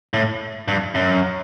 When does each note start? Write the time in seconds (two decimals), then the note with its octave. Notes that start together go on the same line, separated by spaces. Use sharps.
0.14 A2
0.68 G2
0.95 F#2